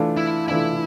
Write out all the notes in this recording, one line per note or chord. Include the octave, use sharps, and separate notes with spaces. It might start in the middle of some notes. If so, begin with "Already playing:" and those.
Already playing: E3 A3 D4 F4
E4
E3 A3 D4 E4 F4